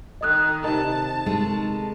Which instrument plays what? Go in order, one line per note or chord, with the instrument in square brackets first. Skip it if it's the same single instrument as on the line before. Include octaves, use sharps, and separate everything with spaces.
[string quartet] D#3 [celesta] D#5 D#6 F#6
[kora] C3 D#3 [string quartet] A5
[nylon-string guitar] G#3 A3 D#4